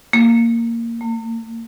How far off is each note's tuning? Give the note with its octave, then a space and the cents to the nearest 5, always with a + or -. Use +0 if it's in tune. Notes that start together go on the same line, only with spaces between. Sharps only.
A#3 -10
A#3 -45